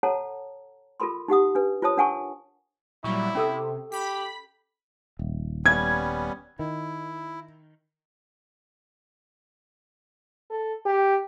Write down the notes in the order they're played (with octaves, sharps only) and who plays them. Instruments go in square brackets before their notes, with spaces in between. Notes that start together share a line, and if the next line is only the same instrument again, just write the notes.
[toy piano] A4 C#5 F#5 A5 A#5
F4 A4 A#4 B5 C6
D#4 G4 F#5 D#6
D4 B4
F4 C5 C#5 A5 D#6
D4 A#4 F#5 G#5 A5 C#6
[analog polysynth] A#2 F#3 G3 [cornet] E4 [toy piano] C#6
[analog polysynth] C3 [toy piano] C#4 A4 E6
[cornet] G4 [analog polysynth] B5 B6
[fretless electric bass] D#1
[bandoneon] G3 B3 C#4 [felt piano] G#6
[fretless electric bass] D#3 [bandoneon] E4
[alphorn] A4
G4